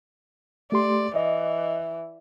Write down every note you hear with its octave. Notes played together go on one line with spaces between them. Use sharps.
A3 G4 D5 C6
E3 D#5